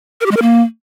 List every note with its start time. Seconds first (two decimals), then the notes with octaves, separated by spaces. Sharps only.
0.21 A#4
0.26 G4
0.31 G#3
0.37 A#4
0.42 A#3